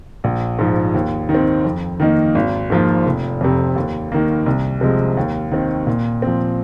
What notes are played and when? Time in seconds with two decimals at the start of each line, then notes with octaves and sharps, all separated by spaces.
0.24 A#1
0.59 G#2 F3
0.94 D#2
1.29 D#3
1.35 C4
1.65 F2
2.00 D#3 A#3 D#4
2.35 G#1
2.70 G#2 F3 A#3 F4
3.06 F1
3.41 F2 C3
3.76 D#2
4.12 D#3 A#3
4.46 C2
4.81 C3 F3 G#3
5.17 D#2
5.52 D#3 C4
5.87 A#2
6.22 F3 C4